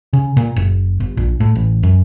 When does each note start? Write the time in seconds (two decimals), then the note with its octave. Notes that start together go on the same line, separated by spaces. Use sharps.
0.13 C#3
0.37 A#2
0.56 F#1
1.00 G1
1.17 A#1
1.40 A2
1.55 A1
1.83 F#2